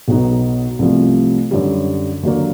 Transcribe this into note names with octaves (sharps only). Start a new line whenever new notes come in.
B1 B2 F#3 B3 D#4
C2 C3 F3 A3
F#2 D3 G3
D#2 D3 F#3 A#3